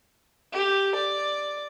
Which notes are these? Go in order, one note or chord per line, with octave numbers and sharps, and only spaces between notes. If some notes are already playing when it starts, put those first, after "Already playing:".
G4
D5